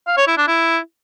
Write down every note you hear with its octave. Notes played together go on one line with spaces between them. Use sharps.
F5
C#5
E4
D4
E4